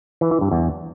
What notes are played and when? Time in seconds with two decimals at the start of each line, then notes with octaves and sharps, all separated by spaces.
0.21 E3
0.31 E3
0.41 G2
0.51 E2